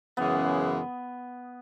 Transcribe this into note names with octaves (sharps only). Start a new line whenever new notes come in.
F#2 C#3 E3 G#3 B3 C#4